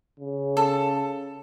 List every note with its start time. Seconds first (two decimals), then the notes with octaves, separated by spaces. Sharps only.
0.20 C#3
0.57 A4